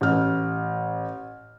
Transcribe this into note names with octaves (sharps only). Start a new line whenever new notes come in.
A1 F6